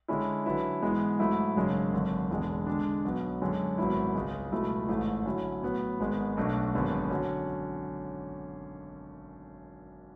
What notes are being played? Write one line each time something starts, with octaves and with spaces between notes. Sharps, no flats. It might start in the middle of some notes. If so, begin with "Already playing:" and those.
D3 G#3 C#4 E4
D3 F#3 C#4 E4 B4
G#2 E3 G#3 B3
G#2 F#3 A3 E4
G#1 F#2 C#3 G#3 D4
G#1 F#2 D3
E1 E2 D3 G#3
D3 G#3 D4
B1 B2 F#3 B3
F#2 D3 G#3 C#4
G#1 G#2 F#3 B3 E4
C#2 C#3 G#3
C#2 B2 F#3 A3 E4
A1 G#2 E3 A3
D3 F#3 C#4 E4
A2 F#3 B3
G#1 G#2 G#3 B3
B1 B2 A3 D4 F#4
G#1 F#2 D3 G#3 B3
D3 F#3 C#4